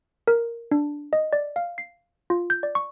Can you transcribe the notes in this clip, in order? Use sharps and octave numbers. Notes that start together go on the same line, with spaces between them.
A#4
D4
D#5
D5
F5
C7
F4
G6
D5
C#6